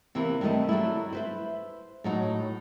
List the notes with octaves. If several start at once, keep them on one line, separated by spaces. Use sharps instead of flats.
C3 E3 A#3 C4 E4
G2 D#3 F#3 A3 D#5
F#3 G3 A3 E4
E4 B4 C5
A2 F#3 D#4 F#4